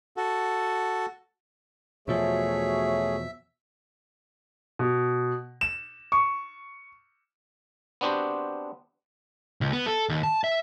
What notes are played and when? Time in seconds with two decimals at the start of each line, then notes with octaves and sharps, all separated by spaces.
0.17 F#4 A4
2.08 E2 B2 F3 A3 F#4 G#4 C#5 E5
4.79 B2
5.61 E7
6.12 C#6
8.01 B3 C4 D4 F#4 G4 C5
9.61 C#2
9.73 B3
9.86 A4
10.09 D#2
10.23 A5
10.44 E5